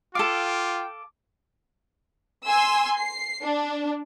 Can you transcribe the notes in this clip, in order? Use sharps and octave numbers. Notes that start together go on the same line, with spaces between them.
F4 A4 F5 G5 D6
G#5 C6 E6
C7
D4